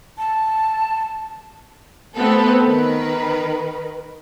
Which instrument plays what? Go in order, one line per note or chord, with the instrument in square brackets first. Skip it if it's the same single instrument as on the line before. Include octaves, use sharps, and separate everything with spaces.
[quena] A5
[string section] A3 B3 C4 A4
D#3 A#4 B4